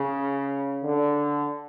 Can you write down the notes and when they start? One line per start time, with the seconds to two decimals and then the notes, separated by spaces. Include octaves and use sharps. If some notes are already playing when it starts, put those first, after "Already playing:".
Already playing: C#3
0.84 D3